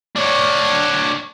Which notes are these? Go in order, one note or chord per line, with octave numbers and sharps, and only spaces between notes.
D4 C#5